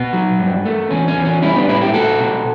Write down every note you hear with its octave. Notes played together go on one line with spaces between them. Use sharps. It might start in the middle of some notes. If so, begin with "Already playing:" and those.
Already playing: B2 B3
F#3
G2
A3
E2 C#4
C#4
E2
C#4
G3 C#4 E4
B3 D4
A2 C#4 E4
E4 G4
A3 F#4 A4
B2